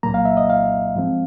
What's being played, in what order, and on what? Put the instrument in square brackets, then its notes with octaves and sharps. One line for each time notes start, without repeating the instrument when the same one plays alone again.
[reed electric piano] C2 A#2 F#3 A#3 A#5
F5
E5
D#5
F5
G#2 F3 G#3 C4